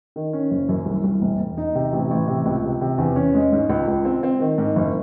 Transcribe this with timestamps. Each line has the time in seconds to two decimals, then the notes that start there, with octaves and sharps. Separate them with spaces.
0.16 D#3
0.33 C#4
0.51 F#1
0.69 F#2
0.86 C2
1.04 C2
1.21 E1
1.40 E1
1.58 D#4
1.75 C3
1.93 A1
2.11 A1
2.28 C3
2.46 C#2
2.63 C3
2.81 C3
2.98 E2
3.16 C#4
3.35 G#3
3.52 G#2
3.69 C#2
3.87 C#2
4.05 C4
4.23 C4
4.40 D#3
4.58 G#2
4.76 F#1